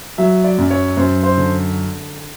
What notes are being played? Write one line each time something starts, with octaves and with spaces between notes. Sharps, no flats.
F#3 E5
D5
F#2
C#5
F#2 C5
C5
D3